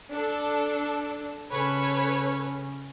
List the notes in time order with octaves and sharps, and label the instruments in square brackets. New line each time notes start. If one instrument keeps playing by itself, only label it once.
[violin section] D4 A4
[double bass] C#3 C#4 [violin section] A4 B4 C#5